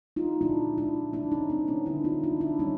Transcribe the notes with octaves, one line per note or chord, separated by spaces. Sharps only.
D#4 F4
A#2 F3 G#3 D4 E4
D4 E4
B2 G3 A#3 D4 E4
C#4 D#4
C4 D4
B3 C#4
D3 G3 A#3 D4 E4
D#4 F4
D4 E4
D4 E4
C#3 E3 G3 C#4 D#4